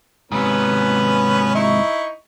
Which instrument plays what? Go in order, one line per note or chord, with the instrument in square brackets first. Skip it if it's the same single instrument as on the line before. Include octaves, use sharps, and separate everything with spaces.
[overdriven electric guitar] G#2 C3 [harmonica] B3 C#4 B4
[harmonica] D#4 E4 C#6